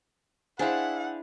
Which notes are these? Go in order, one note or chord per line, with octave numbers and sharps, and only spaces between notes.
D4 E4 G#4 C5 F5 F#5